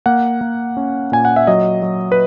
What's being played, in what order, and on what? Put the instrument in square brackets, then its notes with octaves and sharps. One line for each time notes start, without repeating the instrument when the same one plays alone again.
[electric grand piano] A#3 F#5
A#3
C#4
A#2 G#5
F#5
E5
F#3 D#5
F#3
B4